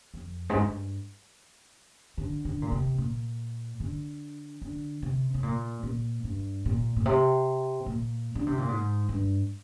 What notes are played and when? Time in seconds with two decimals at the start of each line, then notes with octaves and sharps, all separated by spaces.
0.14 F2
0.50 G#2
0.55 G2
2.18 D3
2.45 D3
2.62 A#2
2.72 C3
2.98 A#2
3.80 D3
4.62 D3
5.02 C3
5.34 C3
5.43 A#2
5.83 A#2
6.24 G2
6.66 A#2
6.96 A#2
7.06 C3
7.86 A#2
8.35 D3
8.47 C3
8.58 A#2
8.68 G#2
9.09 G2